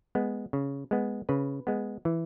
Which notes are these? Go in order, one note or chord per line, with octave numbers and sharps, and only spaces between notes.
G#3 B3
C#3
G#3 B3
C#3 B4
G#3 B3
E3